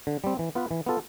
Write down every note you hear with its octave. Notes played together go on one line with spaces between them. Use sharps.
D3
G3 C4
E3
B3 F4 B4
E3
B3 F4 A4